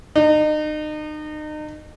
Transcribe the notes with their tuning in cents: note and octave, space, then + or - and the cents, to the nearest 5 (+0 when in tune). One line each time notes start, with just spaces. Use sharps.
D#4 -35